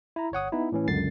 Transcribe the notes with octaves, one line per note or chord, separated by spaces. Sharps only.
E4 A#5
G1 C#5 F#5 D#6
B3 D#4 E4
A2 E3 C#4
C#2 F#2 D3 A6 C7